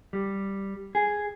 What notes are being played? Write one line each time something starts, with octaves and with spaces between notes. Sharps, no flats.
G3
G#4